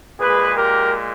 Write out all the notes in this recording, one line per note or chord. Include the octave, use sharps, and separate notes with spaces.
A#2 G#3 G#4 B4
G4 A#4